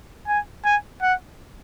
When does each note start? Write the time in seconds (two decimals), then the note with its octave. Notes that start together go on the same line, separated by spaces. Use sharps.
0.28 G#5
0.65 G#5
1.02 F#5